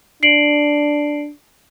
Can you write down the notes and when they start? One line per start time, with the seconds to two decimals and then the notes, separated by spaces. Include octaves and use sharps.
0.23 D4 C7 D7 F#7